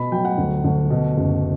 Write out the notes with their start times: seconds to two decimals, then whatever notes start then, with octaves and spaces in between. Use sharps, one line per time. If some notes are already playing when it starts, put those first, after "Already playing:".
Already playing: B2 B5
0.12 F#3 G5
0.25 F#5
0.38 D2
0.64 D2
0.90 B2
1.16 F#1